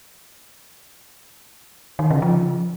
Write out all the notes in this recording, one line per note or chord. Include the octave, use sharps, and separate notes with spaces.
D#3
C#3
F3